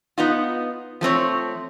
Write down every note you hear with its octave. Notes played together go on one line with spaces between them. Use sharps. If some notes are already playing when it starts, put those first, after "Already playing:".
B3 D#4 F4
F3 A3 C4 C#5